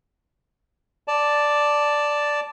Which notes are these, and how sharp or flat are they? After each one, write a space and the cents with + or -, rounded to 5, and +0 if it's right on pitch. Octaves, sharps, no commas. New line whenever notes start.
D5 +0 A5 +0